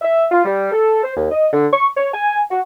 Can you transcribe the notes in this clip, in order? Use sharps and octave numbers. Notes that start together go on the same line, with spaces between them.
E5
F4
G3
A4
C5
D#2
D#5
D3
C#6
C#5
G#5
F#4